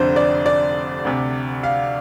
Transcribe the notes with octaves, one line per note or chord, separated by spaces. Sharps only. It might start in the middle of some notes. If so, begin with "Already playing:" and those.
Already playing: F1 F2 D3 C5
D5
D5
D2 C3
F5